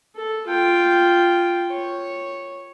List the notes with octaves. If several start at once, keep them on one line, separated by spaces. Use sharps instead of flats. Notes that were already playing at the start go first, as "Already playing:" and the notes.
A4
F4 G5
C#5